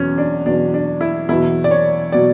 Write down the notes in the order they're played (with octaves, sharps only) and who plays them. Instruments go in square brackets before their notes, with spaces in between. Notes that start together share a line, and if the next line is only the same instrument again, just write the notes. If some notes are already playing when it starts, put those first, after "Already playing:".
Already playing: [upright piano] E2 B2 F#3 C#4
D4
E2 B2 F#3 D4
D4
E4
E2 B2 F#3 E4
D5
C#5
B2 F#3 D5